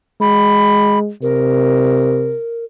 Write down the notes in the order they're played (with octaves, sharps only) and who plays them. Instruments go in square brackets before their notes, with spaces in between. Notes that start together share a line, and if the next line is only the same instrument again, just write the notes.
[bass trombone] G#3 [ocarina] B5
[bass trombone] C3 [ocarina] A#4